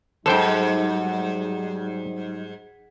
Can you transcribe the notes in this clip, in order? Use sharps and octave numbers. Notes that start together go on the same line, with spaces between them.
E2 G#2 F#3 G3 D#4 A4 C5 G5